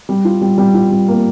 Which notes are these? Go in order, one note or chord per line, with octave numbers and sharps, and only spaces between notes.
G3
F4
G3
G3
F4
G3
A#3